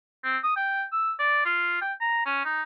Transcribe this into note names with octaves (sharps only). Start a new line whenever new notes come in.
C4
D#6
G5
E6
D5
F4
G5
A#5
C#4
D#4